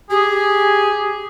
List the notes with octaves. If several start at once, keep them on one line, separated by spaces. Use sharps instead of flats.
G4 G#4